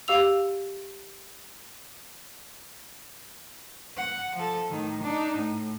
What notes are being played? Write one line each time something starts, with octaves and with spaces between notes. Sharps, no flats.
G4 F5 E6 F7
F#5
F3 A4
A2 D#3
D4 D#4
A2